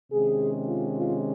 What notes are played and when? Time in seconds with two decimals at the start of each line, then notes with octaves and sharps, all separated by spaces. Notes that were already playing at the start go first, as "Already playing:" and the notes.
0.11 C3 D#3 G#3 C#4 G#4
0.68 F4
0.96 F4